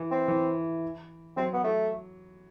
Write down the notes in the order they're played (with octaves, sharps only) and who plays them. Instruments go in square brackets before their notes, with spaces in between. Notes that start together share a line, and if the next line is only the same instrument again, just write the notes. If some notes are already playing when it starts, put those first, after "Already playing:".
Already playing: [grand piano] E3
[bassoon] C4
[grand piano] E3
[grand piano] F#3 [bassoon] C4
[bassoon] B3
A3